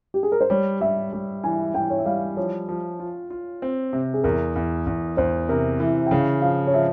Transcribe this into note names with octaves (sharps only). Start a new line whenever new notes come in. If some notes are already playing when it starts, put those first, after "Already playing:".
G4
G#4
A#4
C5
G3 C#5
G3 E5
G3
E3 G#5
E3 G5
C#5
E5
G3 F5
F3 C#5
F3
F4
F4
C4
C3
G#4
E2 A#4
E2
E2
E2 C5
C3 A#4
E3
G5
C#3 F5
F3 F5
C#5
F3 E5